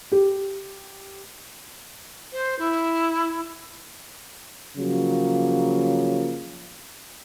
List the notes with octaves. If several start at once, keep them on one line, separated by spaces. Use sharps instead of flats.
G4
C5
E4
C#3 F3 F#3 A#3